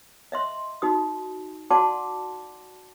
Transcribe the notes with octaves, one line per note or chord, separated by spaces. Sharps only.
D#5 E5 C6
D#4 F#4 D#6
F#4 D5 F#5 A5 C6 D6